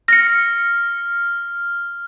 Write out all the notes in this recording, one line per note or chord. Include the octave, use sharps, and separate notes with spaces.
F6 A#6 C#7